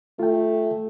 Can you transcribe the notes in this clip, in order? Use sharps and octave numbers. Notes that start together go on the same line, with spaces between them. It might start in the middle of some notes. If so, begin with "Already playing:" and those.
A3 F4 G5